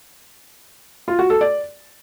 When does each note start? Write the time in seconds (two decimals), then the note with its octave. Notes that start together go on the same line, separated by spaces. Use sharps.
1.08 F4
1.19 F#4
1.30 A4
1.41 D5